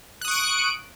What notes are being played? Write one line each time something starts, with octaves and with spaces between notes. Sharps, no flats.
C#6 D#6 F#6 D7